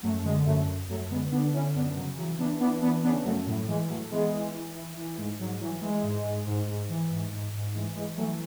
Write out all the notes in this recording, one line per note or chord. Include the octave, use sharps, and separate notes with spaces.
F#2 F#3 A3
D3 G#3
F#2 F#3 A3
F#2
F#2 F#3 A3
D3 G#3 B3
D3 B3 D4
D3 C#4 E4
F#2 B3 D4
C#3 F#3
E3 F#3
E3 B3 D4
E3 B3 D4
E3 B3 D4
C#3 B3 D4
F#2 F#3 A3
A2 F#3
E3 G#3
A2 F#3 A3
E3 G#3 B3
E3
E3
E3
E3
G#2 G#3
G#2 F#3
E3 F#3
E3 G#3
G#2
G#2
G#2
G#2
E3
G#2
G#2
G#2
E3 G#3
E3 G#3
E3 F#3 A3